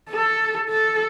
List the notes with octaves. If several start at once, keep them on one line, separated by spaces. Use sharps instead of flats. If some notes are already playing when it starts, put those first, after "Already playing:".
A4
A4